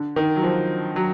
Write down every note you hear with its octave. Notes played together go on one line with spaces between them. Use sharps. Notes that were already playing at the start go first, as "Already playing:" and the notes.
Already playing: D3
D#3
F#3
F3
F#3